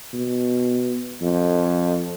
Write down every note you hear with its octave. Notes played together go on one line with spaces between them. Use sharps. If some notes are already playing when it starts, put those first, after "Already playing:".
B2
F2